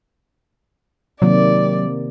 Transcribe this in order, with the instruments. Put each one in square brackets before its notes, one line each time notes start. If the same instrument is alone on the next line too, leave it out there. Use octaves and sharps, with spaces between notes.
[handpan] C3 D#3 A#3 [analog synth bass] F#3 [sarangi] D5